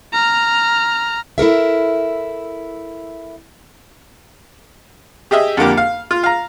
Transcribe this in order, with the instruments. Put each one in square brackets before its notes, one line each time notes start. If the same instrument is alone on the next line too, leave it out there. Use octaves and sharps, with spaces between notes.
[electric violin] A#5 F6
[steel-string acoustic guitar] E4 A4 A#4 E5
[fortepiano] G4 G#4 D#5 E5
F2 D3 A#3 G4
F5
F4
F5 A#5